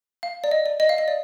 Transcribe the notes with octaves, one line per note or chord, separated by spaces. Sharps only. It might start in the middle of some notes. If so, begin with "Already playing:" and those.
F5
D5
D#5
D5
D#5
F5
D#5
D5